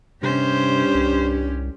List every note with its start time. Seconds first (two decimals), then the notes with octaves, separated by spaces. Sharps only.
0.23 G2 C3 C#4 G4 C5
0.95 C2